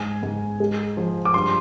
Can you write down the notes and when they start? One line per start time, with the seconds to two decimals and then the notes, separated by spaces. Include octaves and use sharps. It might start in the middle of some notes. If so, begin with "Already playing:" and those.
Already playing: G#2 G#5
0.23 G#2
0.60 G#3
0.97 F3
1.25 D6
1.34 G2 C6